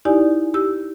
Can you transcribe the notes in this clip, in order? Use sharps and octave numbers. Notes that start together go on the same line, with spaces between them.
D#4 E4 G4 D5 G#5
G4 E6